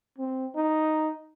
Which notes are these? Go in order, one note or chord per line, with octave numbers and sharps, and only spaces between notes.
C4
D#4